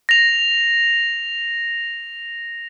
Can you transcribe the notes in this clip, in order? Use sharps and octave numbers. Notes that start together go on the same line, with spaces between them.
A#6 F7